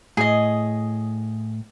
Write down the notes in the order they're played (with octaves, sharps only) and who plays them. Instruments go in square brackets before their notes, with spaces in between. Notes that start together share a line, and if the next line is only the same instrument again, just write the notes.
[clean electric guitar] A2 [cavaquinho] G#4 D#5